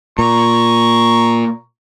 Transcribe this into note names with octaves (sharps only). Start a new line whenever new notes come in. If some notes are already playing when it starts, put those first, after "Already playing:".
A#2 A#5 C#6